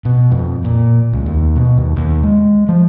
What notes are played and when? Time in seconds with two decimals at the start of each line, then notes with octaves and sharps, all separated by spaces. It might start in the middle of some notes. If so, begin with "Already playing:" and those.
0.05 B2
0.31 F2
0.65 A#2
1.13 C#2
1.26 D#2
1.56 B2
1.78 D#2
1.97 D#2
2.23 G#3
2.69 F3